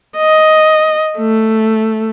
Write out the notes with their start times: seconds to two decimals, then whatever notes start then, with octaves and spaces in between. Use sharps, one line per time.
0.17 D#5
1.18 A3